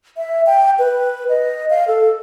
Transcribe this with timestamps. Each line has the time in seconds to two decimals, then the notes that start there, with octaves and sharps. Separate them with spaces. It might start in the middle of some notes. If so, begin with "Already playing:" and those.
0.17 E5
0.46 G5
0.79 B4
1.29 D#5
1.70 F5
1.88 A4